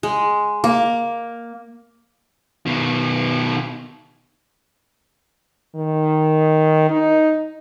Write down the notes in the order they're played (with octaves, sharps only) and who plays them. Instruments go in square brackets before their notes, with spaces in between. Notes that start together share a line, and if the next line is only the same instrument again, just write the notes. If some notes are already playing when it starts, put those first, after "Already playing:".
[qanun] G#3
A#3
[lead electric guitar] B2 D#3
[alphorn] D#3
D#4